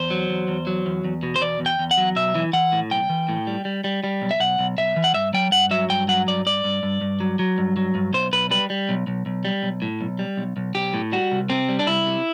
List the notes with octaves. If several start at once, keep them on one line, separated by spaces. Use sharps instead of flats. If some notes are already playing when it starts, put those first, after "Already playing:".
Already playing: E2 C5
F#3
E2
E2
F#3
E2
E2
B2
C5
E2 D5
E2
G5
E2
F#5
F#3
B1 E5
E3
E3 F#5
A2
B1 G5
E3
A2
G3
G3
G3
G3
B1
E5
B1 F#5
B1
B1 E5
E3
F#5
G2 E5
F#3 G5
G2 F#5
F#3 E5
G2 G5
F#3 F#5
G2 D5
G2 D5
G2
G2
G2
F#3
F#3
G2
F#3
G2
B1 C5
B1 B4
G3 B4
G3
B1
B1
B1
G3
B1
A2
B1
G3
B1
B1
B1 G4
A2
G3 F#4
C2
C3 C4
G3
D4
C2 E4
C3